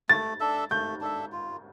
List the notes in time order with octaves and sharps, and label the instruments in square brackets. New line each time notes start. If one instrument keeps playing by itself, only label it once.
[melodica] A3 [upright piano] A6
[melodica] D4 A4 E5
[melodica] A3 [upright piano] G6
[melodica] D4 A4 E5
F4